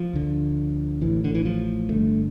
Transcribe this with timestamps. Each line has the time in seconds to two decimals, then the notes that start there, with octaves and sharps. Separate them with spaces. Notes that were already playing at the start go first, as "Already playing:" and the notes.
Already playing: F3
0.13 D2 D3
1.01 A1 A2 E3
1.24 D3
1.35 E3
1.45 F3
1.89 G1 G2 D3 A3